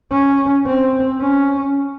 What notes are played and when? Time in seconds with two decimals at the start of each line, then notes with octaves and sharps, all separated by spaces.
0.11 C#4
0.67 C4
1.21 C#4